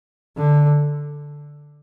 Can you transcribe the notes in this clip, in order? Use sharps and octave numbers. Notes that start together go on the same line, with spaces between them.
D3